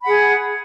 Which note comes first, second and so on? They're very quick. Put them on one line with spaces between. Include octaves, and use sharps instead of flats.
B5 F#5 G#4